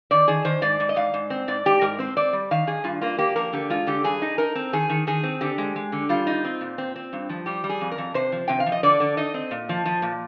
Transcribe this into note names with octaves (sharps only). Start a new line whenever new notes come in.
D#3 D5
D#3 G#4
D#3 C5
G#2 D5
G#2
D#5
G#2 F5
G#2
C4
G#2 D5
G#2 G4
G#2 A#4
C4 C5
C4 D5
G3
D#3 F5
D#3 G#4
G2 F4
A#3 F4
A#3 G4
F3 A#4
D3 G4
G#3 F4
D3 G4
G2 G#4
D#4
D#4 A#4
C4
D#3 G#4
D#3
D#3 G#4
C4
D3 G4
G#3
G#3
D3
G3 F4
D#4
C4
A#2
C4
C4
G2
F3
G3 G4
G3
G#4
F2
A#4
F2
C3 C5
F3
C3 G5
F5
F3
D#5
D3 D5
D3
D#4 D#5
C4
A#2
F3
F3
A#2